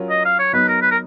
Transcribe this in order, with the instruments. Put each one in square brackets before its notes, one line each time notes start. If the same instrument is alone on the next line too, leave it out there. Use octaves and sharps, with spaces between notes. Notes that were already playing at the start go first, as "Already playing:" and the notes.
Already playing: [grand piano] F#3 C#4 F4 A#4
[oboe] D#5
F5
C#5
[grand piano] F#3 B3 D#4 [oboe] B4
[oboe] A#4
B4
A#4